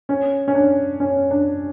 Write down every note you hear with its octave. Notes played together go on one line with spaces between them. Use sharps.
C#4
C#4
D4
C#4
D4